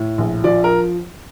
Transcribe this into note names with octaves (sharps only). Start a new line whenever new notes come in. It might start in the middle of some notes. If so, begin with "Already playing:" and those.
Already playing: A2
A#1
F3 D5
A#4